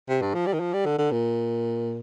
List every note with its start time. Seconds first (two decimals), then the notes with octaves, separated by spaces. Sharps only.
0.09 C3
0.22 G2
0.34 F3
0.47 G3
0.53 D#3
0.60 F3
0.73 G3
0.85 D3
0.98 D3
1.12 A#2